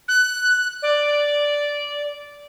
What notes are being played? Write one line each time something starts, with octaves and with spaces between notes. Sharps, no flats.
F#6
D5